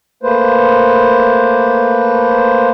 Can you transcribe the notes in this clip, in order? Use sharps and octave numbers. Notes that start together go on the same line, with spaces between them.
A3 A#3 B4 C5